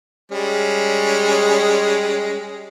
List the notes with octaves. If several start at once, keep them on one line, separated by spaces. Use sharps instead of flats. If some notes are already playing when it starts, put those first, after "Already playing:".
G3 G#3 C#4